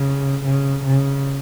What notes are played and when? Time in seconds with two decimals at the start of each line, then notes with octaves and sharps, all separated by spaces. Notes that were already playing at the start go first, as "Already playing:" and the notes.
Already playing: C#3
0.44 C#3
0.84 C#3